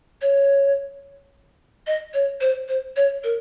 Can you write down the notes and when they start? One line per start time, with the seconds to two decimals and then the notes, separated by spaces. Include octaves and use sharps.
0.21 C#5
1.86 D#5
2.13 C#5
2.40 C5
2.68 C5
2.96 C#5
3.23 A#4